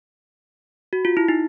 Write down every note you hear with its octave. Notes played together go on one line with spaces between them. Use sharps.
F#4
F4
E4
D#4